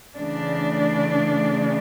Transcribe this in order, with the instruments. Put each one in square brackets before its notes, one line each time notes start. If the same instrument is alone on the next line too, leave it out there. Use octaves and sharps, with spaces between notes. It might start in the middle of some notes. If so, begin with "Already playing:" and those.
[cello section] C#3 E3 A3 D4